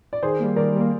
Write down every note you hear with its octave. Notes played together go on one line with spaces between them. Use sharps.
D5
D#3 G#4 C5
G3 A#3
D#3 A#4 D5
G3
A#3